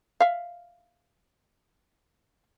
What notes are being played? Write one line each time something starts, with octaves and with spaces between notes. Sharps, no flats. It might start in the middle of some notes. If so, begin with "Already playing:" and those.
E5 F5